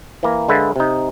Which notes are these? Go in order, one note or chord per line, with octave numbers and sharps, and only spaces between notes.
E3 A#3 A#5
D3 G#3 A#3 B4 E5 A5
C3 D#4